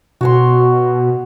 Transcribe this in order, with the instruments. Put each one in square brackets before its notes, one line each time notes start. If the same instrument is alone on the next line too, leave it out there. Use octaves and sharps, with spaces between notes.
[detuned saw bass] B2 [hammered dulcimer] F#4 C#5 C6